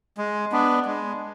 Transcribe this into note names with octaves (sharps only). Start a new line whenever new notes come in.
G#3
B3 D4
G#3